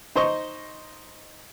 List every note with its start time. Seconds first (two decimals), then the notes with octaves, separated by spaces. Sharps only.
0.15 D#4 C5 D#5 C#6